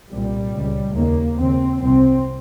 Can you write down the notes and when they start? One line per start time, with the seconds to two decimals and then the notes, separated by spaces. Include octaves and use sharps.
0.11 C2 A#2 G3
0.53 C#2 C#3
0.96 D#2 C#3 A#3
1.39 D#2 C#3 C4
1.81 C2 C3 C4